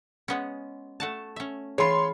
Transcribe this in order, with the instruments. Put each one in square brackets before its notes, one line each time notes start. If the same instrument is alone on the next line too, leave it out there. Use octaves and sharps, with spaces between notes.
[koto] G#3 B3 C#4
A3 F#4 A5
C#4 E5
[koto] E3 F4 [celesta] G#4 B5 [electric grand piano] C#5 C6